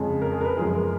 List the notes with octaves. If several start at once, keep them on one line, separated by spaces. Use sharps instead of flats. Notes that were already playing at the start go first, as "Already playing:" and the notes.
Already playing: F2 C#3 G#3
A#4
G#4
A#4
B4
F#2 F3 G#3 G#4
A#4